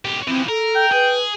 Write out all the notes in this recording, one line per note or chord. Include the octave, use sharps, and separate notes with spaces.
B1 G4
E3 F3 C4
A4 A#4
G5
G#4 B4